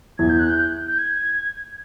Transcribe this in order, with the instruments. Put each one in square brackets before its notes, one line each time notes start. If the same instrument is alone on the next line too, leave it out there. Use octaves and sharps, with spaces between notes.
[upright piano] E2 [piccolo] G#6
[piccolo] G6
F#6
G6
G6
G#6